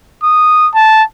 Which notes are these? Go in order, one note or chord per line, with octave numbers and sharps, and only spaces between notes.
D#6
A5